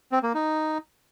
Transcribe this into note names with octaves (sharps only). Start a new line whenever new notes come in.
C4
A#3
D#4